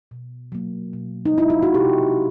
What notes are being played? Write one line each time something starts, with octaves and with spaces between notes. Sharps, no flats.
B2
F#3 A#3
B2
D#4
G#3 E4
F4
F#4
C3 G4